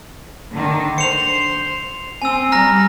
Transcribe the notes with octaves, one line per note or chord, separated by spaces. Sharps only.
D3 D#3 D4
C5 C#7 F7
C4 G#5 E6
G3 A#5 F6 A#6